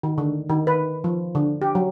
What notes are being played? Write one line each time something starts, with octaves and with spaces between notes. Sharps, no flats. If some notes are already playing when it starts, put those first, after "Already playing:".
D#3
D3
D#3
B4
F3
D3
G4
F#3